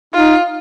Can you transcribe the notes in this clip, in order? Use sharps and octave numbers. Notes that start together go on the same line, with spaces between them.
D#4 F4